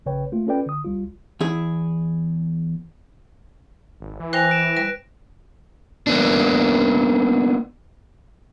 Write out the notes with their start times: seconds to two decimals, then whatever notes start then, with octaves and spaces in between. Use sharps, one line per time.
0.06 A#1 C#3 B4 C#5 G5
0.32 A3 A#3 F4
0.47 C#4 F4 A4 B4 D5 G5
0.66 D3 D#6
0.85 C2 G3 F4
1.41 E2 E4 G#4
4.00 G#1
4.20 E3
4.33 C5 G5 G#5 F#6 A#6 F7
4.50 A#6 D7 E7
4.77 G3 B4 D7
6.07 A#3 B3 D4